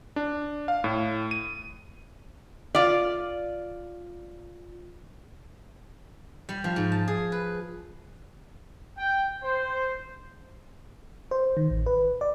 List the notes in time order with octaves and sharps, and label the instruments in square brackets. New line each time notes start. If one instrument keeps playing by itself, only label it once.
[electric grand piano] D4
F5
A2
D#7
[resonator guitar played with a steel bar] F4 D5
[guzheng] G3
F3
G#2
A5
G#4
B4
[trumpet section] G5
C5
[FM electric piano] C5
D#3
A1
B4
D5